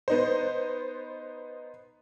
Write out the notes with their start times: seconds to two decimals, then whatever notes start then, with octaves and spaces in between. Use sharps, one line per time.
0.08 B3 D#4 C5